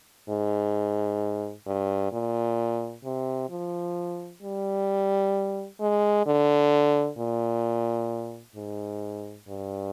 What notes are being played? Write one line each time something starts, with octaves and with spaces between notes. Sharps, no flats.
G#2
G2
A#2
C3
F3
G3
G#3
D3
A#2
G#2
G2